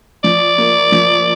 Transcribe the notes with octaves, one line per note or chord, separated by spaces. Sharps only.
F3 D5
A#3
F3